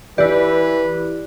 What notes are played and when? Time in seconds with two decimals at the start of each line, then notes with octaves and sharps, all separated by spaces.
0.18 E3 E4 G4 B4 D5